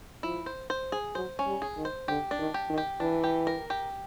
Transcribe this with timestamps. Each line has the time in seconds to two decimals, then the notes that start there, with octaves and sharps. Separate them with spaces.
0.23 F3 E4
0.46 C5
0.70 C5
0.92 G#4
1.15 F#3 C5
1.39 C#4
1.46 G3
1.62 G#4
1.77 D#3
1.85 C5
2.08 D3 G4
2.31 D4
2.39 D#3
2.54 G4
2.70 D#3
2.78 G4
3.00 E3 D4
3.24 G4
3.47 A#4
3.70 G4